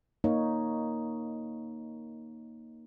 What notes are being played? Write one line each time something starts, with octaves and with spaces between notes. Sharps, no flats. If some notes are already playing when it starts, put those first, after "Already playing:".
A#3 D#4 C#5